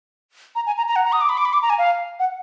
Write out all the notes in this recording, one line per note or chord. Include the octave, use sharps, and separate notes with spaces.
A#5
G#5
A#5
A#5
F#5
A#5
D#6
D6
B5
D6
B5
D6
A#5
G#5
F5
F#5